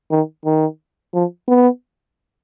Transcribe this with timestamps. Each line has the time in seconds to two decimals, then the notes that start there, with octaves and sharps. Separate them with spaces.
0.11 D#3
0.45 D#3
1.14 F3
1.48 B3